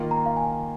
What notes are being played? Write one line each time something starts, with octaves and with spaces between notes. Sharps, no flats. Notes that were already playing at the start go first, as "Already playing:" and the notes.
Already playing: D#3 A#3 F4
A#5
F5
G#5